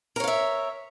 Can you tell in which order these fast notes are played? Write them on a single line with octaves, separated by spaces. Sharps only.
A#4 C#5 F5 E5